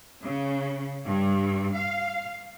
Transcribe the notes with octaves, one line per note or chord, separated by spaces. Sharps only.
C#3
G2
F5